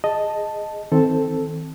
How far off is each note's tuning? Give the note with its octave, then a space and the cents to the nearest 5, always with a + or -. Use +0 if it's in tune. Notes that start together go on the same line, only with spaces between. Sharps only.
G#4 +0 D#5 +0 A5 +0
D#3 +40 C4 +0 A4 +0